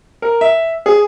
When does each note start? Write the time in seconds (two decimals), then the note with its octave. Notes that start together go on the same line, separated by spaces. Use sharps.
0.22 A#4
0.41 E5
0.86 G#4